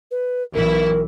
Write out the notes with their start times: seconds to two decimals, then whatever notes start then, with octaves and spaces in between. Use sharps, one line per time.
0.11 B4
0.54 B1 E3 E4 A#4